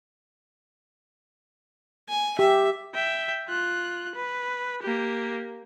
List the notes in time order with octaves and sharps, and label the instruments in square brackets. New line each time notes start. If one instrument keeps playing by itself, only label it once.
[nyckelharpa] G#5
[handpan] G4 [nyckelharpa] E5
[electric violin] E5 G5
F4 F#6
B4
A#3 G4